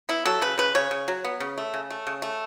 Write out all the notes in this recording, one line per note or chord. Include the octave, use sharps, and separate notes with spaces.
B3 E4
F#3 A4
C#3 B4
C#3 B4
C#3 C#5
C#3
F#3
B3
C#3
A3
C#3
A3
C#3
A3